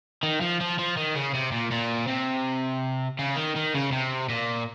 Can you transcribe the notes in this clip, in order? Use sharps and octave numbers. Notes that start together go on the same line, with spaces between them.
D#3
F3
F3
F3
D#3
C#3
C3
A#2
A#2
C3
C#3
D#3
D#3
C#3
C3
A#2